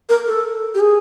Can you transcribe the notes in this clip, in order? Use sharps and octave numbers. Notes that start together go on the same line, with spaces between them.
A#4
A4
G4
G#4